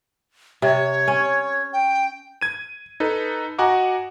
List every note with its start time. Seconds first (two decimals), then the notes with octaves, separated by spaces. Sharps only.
0.62 C3 C#5
1.08 C#4
1.73 G5
2.41 G#6 D#7
3.00 D#4 A4 B4
3.58 F#4 D#5 F#5 G#5 A#5 D6